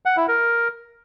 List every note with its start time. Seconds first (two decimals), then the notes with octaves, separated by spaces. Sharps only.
0.06 F#5
0.17 E4
0.28 A#4